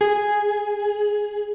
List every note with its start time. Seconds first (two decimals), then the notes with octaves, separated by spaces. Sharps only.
0.01 G#4